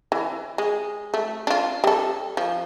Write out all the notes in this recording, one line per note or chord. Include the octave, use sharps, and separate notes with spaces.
E3
G#3
A3
D4 F4
G3 A4
F3